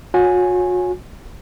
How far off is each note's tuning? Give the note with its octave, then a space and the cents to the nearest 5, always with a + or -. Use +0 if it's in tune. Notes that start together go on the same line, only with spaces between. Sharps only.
F#4 -40 C#5 +0 G#5 +0